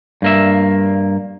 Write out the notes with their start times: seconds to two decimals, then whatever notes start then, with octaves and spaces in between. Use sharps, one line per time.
0.22 G2 A#3 E5